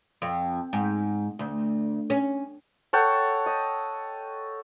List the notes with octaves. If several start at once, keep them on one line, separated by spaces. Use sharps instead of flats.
F2
G#2
D2
C#4
A4 C#5 F#5 G5
D#5